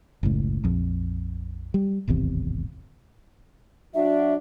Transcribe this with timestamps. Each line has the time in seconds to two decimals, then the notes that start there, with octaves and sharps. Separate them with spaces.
0.23 F#1 C#2 A2
0.64 A#1 F2
1.74 G3
2.08 D1 G#1 E2 C3
3.94 F#3 D4 F#4 E5